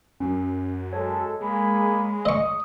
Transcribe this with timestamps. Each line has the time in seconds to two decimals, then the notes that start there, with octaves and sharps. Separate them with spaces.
0.20 F#2 C#4
0.93 G#3 A4 C#5
1.41 G#3 A#3 G#4 B5
2.25 D#5 C#6 D#6